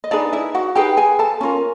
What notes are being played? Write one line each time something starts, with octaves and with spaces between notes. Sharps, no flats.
D#5
D4 D#4 G#4 B4 D5
E4 E5
F#4 F#5
D#4 G4 G#4 B4 G5
G#4 G#5
A4 A5
C#4 F4 A#4